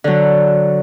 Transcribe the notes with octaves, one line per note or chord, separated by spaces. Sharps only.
D3 F#3